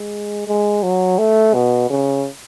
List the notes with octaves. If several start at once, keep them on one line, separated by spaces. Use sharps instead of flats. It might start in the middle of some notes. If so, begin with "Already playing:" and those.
Already playing: G#3
G#3
F#3
A3
B2
C#3